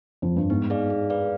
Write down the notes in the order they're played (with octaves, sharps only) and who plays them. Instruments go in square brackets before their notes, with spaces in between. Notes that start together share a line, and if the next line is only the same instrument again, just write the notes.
[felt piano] F2
G2
[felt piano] G#2 [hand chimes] B3
[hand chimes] D#4 G#4 D5 F5
G#4
B4 D5 F5